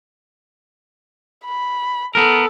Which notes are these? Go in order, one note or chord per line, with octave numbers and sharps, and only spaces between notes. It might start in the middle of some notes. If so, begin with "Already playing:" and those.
B5
B3 A4 A#4